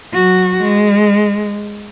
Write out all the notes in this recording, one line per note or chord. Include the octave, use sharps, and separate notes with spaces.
F#3 F#4
G#3